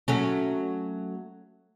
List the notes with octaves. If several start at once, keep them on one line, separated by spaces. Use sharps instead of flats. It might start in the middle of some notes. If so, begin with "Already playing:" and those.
F#3 A3 C#4